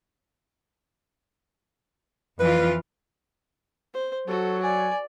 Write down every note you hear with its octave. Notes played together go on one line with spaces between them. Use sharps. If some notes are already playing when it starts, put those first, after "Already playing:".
F2 E3 F4 B4
C5
F#3 F#4 A4
D5 G#5